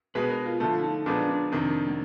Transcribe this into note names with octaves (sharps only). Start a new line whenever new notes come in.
B2 G#3 B3 B4
A#4
F4
D3 F3 A3 F4
E4
D#4
A#2 F3 G#3 B3 D4
D4
F2 C3 D#3
A#3